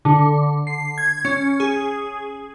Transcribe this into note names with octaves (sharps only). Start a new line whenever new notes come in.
D3
C7
G#6
C#4
G#4